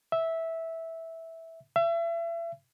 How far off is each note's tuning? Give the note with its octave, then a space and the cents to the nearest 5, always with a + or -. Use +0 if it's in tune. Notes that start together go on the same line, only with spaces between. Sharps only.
E5 -10
E5 +35